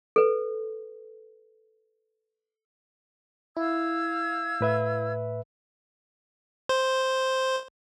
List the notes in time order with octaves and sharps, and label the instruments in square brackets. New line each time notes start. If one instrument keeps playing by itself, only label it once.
[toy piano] A4 B4
[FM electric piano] E4 [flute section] F5 E6 G#6
[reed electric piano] A2 B4 E5
[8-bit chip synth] C5